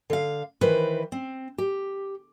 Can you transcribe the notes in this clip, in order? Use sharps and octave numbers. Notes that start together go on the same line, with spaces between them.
D3 F5
D#3 E3 B4 C5
C4
G4